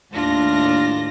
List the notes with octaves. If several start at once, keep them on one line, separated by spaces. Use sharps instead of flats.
D#2 A2 D4 F4 A#6